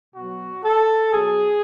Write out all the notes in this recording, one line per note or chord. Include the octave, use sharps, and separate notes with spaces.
B2 F#3 F#4
A4
B2 F#3 G#4